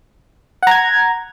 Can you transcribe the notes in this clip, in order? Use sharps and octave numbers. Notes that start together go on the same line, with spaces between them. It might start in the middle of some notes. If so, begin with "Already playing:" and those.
F#5 A#5 G#6